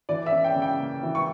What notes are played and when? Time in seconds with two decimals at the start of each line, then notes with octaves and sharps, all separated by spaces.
0.09 E3 D5
0.26 E5
0.32 C#4
0.44 G5
0.55 C#3
0.62 G5
0.79 A#3
1.03 E3
1.15 C#6